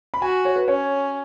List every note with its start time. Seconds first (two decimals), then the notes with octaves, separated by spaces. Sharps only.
0.14 B5
0.22 F#4 G#5
0.45 C#5
0.56 B4
0.68 C#4 C#5